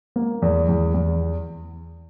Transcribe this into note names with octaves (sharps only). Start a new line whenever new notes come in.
A#3
E2
E2
E2